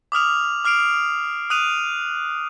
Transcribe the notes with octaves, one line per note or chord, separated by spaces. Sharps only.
D6 D#6 F6 F7
D6 F6 C7 D7 F7
D#6 F#6 D#7 F7